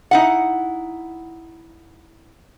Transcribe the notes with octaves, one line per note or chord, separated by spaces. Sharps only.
D#4 E4 F#5